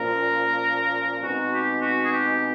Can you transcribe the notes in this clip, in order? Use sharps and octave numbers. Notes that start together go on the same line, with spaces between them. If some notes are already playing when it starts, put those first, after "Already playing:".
Already playing: A#2 F3 A#3 C#4 A#4
B2 G#3 C4 D#4 F#4
G4
F#4
G#4
G4